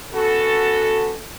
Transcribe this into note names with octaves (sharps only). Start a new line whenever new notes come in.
B3 C#4 F#4 A4